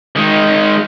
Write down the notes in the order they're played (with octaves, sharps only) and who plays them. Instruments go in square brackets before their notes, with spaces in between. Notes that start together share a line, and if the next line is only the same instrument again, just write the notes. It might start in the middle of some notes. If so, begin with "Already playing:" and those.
[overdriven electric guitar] D#3 G#3